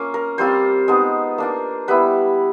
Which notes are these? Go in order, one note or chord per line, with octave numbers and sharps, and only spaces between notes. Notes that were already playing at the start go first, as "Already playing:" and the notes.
Already playing: A#3 C#4 F4
A#4
G3 C4 F4 C5
G#3 B3 D#4
A#3 D4 F4
G3 B3 E4 B4